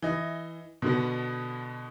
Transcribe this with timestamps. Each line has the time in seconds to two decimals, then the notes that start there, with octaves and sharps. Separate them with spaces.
0.02 E3 D#5
0.82 B2 D3 B3